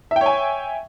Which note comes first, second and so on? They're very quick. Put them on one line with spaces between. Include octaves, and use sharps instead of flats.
E5 G5 C#5 G#5